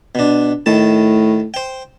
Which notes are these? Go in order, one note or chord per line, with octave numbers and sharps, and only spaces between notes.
B2 D4
A2 D#3 A5
C5 G5